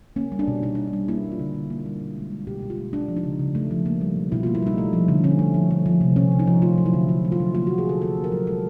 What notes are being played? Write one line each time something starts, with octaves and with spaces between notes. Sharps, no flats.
A#3 C#4
G3
D4
B2
B2 D#4
A#3 D4
D#4
G3
A#3 E4
G3
F4
D3
D3
A#3
G3
B2
G#3
G#3
B2 G4
B2
F4
G#3
A3 D4
F3
D#4
C#3
C#3
A3
F3
A#3
G3
B2
B2 E4
F4
A#3
E4
G3 D#4
A3
F3
D3
D3 C#4
A3
F3
A3
F3
C3
C3 C#4
A3
D#4
F3
A3 F4
F#3
E4
D3
D3 F4
A3
F4
F#3
A#3 F4
F#3 F#4
G#4
D3 A4
D3 A4
A#3
A#4
F#3
G#3 A4